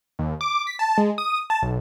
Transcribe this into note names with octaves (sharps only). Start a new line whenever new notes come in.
D#2
D6
B6
A5
G#3
D#6
A5
B1